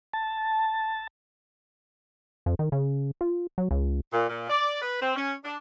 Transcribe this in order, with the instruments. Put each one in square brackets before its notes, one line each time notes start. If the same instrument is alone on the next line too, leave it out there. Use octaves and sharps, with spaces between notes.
[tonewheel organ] A5
[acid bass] F2
D#3
C#3
F4
F#3
C#2
[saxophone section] A#2
A#2
D5
B4
C4
C#4
D4